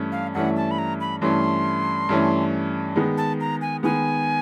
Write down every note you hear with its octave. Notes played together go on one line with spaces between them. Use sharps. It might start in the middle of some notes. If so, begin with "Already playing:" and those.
Already playing: G2 E3 A3 C#4
F5
G2 E3 A3 C#4 F#5
A5
B5
A#5
B5
G2 E3 A3 C#4 C6
G2 E3 A3 C#4
D#3 G#3 B3
A5
A#5
G#5
D#3 G#3 B3 G#5